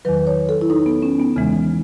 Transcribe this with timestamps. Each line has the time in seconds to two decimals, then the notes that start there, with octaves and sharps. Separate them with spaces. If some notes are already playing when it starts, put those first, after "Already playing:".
0.05 E2 D#3 F#3 B4
0.27 C#5
0.49 A4
0.61 E4
0.70 D#4
0.86 B3
1.03 C#4
1.20 B3
1.36 E2 C#3 E3 G#3